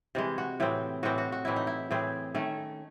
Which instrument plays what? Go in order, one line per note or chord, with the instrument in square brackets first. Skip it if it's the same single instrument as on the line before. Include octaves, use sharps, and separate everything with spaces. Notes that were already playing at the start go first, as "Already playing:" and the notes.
[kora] C3 E3 G#3
F#4
A2 E3 C4
A2 E3 C4 F#4
F#4
F#4
A2 E3 C4 E4
D#4
E4
A2 E3 C4 G#4
D#3 A3 C#4